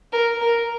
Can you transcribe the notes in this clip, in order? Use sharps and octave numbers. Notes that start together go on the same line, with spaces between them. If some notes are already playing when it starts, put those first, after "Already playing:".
A#4
A#4